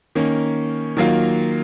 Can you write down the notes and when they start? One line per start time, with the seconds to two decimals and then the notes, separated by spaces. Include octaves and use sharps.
0.15 D#3 A#3 C#4
0.97 D#3 F#3 A#3 F4